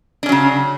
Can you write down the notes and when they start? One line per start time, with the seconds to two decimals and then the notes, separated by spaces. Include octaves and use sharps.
0.23 D4
0.26 C#4
0.29 F#3
0.32 C#3